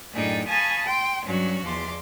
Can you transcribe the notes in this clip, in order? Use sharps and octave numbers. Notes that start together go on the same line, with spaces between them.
F#2 A2 D4 D#4 G#4 G5
F5 G#5 A5 B5 C#6 D#6
G5 C6
G2 F#3 C#4 F#4
E2 F3 G#3 C6 D6